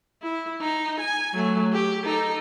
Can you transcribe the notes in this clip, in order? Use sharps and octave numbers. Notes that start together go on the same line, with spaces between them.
E4
D#4
G#5
F#3 A3
G4
D#4 A4